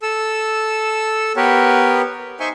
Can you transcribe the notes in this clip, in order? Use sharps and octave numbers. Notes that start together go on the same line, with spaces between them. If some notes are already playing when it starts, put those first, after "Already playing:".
A4 E6
B3 G4 A#4 B4 C#5
D#4 C5 E5 G#5 C6 C#6